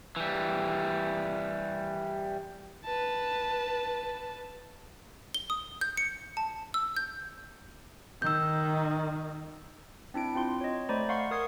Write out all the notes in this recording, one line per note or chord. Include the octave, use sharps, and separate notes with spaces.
E3 G3
B4 A5
G7
D#6
G6
C#7
A5
E6
G6
D#3 E6 G6
C4 D4 E4 D7
C4 F4 C6
C#5 D#5
A3 C5 D5 A#5 B5
F5 F#5 C6 C#6 C7
A#4 D#6 G#6 C7